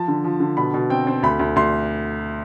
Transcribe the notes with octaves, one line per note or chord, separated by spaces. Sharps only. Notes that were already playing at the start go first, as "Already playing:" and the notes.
Already playing: F3 A5
D3
F3
D3
B2 B5
B2
C4 G5
C4
D2 B5
D2
D2 C6